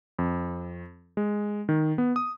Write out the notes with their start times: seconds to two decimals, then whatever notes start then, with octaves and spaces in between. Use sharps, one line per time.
0.19 F2
1.17 G#3
1.69 D#3
1.98 B3
2.16 D#6